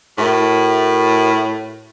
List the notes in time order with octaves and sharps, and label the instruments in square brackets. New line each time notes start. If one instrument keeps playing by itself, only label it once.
[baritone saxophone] A2 [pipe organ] F#4 A#4 E5